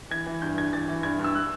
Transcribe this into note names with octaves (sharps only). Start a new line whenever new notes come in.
E3 G#6
E3
G2 G6
G2 G#6
E3 A6
E3
G2 G#6
G2
E6
F#6